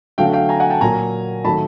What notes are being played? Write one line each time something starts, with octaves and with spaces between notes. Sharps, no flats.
D3 F#3 A3 F5 G5
F5 G5
G#5 A#5
F#5 G#5
G5 A5
A#2 F#3 A#3 G#5 A#5
D#3 F#3 A3 A5 B5